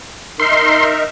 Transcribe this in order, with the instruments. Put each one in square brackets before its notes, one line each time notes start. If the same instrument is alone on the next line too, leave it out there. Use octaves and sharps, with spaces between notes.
[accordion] D#4 A#4 E5 [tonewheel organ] C6